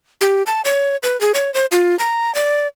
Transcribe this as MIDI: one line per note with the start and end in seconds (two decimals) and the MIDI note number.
0.21 0.43 67
0.46 0.61 81
0.65 0.97 73
1.03 1.19 71
1.21 1.32 68
1.34 1.53 73
1.54 1.66 72
1.72 1.97 65
1.99 2.34 82
2.35 2.68 74